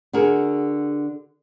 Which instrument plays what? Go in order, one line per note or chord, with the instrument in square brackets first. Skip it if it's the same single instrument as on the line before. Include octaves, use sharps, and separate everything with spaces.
[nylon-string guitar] D3 F#4 G#4 A#4